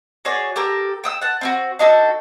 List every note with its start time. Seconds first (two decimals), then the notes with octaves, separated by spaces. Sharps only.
0.25 F#4 G#4 C#5 D5
0.56 G4 A4 A#4
1.04 G5 D#6 E6
1.21 F#5 A5
1.41 C4 E4 F#4
1.79 D4 D#4 F#4 A4